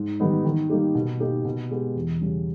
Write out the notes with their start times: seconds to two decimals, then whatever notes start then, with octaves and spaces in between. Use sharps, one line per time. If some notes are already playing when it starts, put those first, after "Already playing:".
Already playing: G#2
0.20 D#3 G3 B3 D#4
0.45 D#3
0.70 G3 A#3 D#4 G4
0.95 B2
1.20 A#3 D#4 G4
1.45 B2
1.71 G#3 B3 G4
1.95 E2
2.21 C#3 G3 C#4